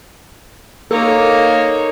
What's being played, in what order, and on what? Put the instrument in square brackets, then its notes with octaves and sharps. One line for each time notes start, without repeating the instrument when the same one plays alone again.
[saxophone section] A#3 [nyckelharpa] D#4 C#5 [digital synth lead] A4